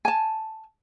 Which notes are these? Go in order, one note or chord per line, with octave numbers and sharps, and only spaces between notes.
G#5 A5